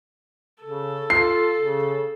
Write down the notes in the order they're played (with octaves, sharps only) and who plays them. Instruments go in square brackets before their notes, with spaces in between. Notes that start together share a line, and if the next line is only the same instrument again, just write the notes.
[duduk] C#3 [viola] A4
[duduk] F4 [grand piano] C7
[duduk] C#3